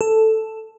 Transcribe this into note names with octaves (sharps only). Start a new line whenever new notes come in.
A4